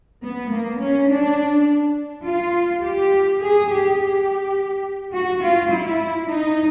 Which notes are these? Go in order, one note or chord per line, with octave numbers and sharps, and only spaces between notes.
B3
A#3
C#4
D4
F4
G4
G#4
G4
G4
F#4
F4
E4
D#4